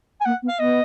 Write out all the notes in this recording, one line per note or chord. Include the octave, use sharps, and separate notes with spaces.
G#5
A#3 F#5
B3
F5
B3 D#5